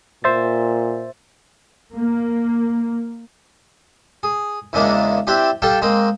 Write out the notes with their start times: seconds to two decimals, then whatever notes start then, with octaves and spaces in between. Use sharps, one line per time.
0.24 A#2 C5 E5 A6
1.95 A#3
4.23 G#4
4.73 E2 C#3 G#3 A#3 D4 E4
5.27 C4 D4 E4 G4
5.62 G3 A4 F5 G5 A5
5.82 G#3 A#3 C4